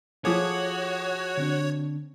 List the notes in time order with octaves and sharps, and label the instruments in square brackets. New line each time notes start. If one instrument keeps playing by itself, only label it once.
[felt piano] F3 G#4 [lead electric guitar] F#4 [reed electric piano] A4 D6 D#6 [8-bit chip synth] C#5
[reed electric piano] D3 C4 D4